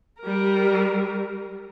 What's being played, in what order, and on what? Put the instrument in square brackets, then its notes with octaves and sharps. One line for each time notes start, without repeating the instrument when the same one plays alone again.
[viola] G3 A#4